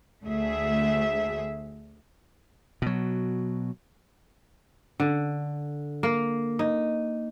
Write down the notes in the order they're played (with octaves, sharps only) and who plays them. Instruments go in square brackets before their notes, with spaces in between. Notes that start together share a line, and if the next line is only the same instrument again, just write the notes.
[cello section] D2 A3 G#4 E5
[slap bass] B2 F#3
[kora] D3
A#3
D#4